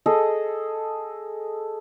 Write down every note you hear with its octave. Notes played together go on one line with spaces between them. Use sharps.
G#4 A4 D#5